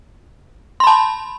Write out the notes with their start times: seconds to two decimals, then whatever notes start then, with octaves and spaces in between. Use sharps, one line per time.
0.80 C6
0.84 B5
0.87 A5